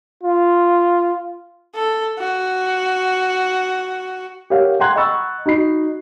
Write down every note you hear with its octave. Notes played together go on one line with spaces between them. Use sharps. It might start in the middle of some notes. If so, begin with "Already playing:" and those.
F4
A4
F#4
G4 A#4 C#5 F5 F#5
F#5 G5 A#5 C6 F#6 G#6
D#5 F#5 B5 C#6 E6 A6
D#4 F#4 B5 C7